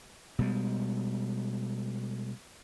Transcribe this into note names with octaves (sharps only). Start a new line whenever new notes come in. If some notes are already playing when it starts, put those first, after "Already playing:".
B2 G3 G#3